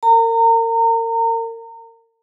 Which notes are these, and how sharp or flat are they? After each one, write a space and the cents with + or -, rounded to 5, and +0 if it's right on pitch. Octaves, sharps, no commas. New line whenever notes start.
A#4 -35 A#5 -30